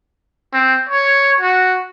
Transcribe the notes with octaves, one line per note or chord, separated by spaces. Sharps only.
C4
C#5
F#4